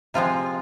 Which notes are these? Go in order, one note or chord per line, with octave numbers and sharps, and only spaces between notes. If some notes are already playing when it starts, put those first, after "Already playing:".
C3 F3 G#3 F4